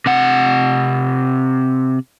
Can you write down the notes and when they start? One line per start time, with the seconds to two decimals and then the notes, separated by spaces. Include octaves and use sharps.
0.06 C3 F#5